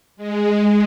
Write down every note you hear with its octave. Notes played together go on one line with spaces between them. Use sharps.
G#3